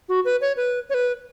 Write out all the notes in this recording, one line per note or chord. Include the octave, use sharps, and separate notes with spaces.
F#4
B4
C#5
B4
C#5
B4